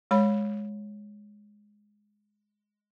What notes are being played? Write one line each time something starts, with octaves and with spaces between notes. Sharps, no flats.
G#3 C#5 B5